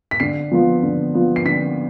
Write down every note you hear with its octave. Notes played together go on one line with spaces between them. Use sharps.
B6
D3 C7
F3 B3 F4
D3
F3 B3 F4
C7
D3 B6